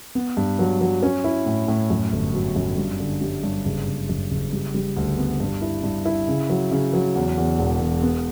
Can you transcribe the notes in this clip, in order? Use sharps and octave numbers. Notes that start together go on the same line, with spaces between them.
B3
G2
F#3
F#3
C#4
E4
A2
A2
F#2
G1
F#3
F#2
G2
D3
G3
G2
F#1
F#1
F#2
F#1
G3
G3
D2
B3
G2
E4
G2
E4
C#3
F#3
C#3
F#3
E2
E2
E1
E1
B3